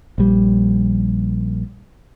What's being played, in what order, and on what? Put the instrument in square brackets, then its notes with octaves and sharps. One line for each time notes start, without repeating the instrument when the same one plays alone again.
[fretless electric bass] A#1 G3